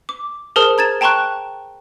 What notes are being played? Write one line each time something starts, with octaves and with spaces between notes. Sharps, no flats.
D6
G#4 A#4 C5 A5 D#6 F6
A#5 G#6 A6 E7
G5 A5 A#5 C6 C#6 F#6